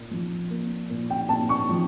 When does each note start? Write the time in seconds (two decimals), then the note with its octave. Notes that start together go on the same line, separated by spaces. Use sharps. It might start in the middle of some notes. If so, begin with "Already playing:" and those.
Already playing: A#2
0.11 F3
0.51 A#3
0.90 A#2
1.10 G5
1.29 A#2 A5
1.49 C#6
1.69 F3